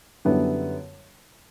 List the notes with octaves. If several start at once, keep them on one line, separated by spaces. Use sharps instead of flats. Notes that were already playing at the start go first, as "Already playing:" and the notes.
F#2 D3 G3 B3 E4